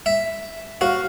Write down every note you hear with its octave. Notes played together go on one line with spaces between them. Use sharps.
E5
F#4 F5